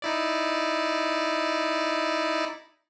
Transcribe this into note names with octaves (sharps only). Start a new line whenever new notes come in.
D#4 E4 D5